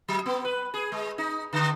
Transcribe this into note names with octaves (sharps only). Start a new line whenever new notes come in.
F#3
B3
B4
G#4
G#3
D#4
D3